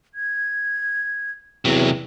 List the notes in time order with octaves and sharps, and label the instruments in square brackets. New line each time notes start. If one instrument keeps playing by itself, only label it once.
[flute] G#6
[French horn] E2 [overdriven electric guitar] C3 F#3